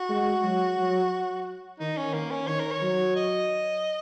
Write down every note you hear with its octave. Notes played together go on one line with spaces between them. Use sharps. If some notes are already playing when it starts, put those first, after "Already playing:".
Already playing: F#4
G#3
F#3
F#3
D#3 D#4
C#4
D#3 A#3
C#4
D#3 C#5
A#4
C#5
F#3
D#5